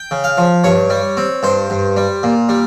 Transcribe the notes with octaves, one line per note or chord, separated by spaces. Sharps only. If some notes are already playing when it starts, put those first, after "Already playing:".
Already playing: G5
C#3
F5
F3
G2 C#5
G3
C4
G2 C5
G2
G3
A#2
G3